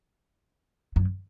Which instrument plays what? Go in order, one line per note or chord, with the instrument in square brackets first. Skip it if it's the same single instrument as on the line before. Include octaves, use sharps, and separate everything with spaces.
[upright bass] F#2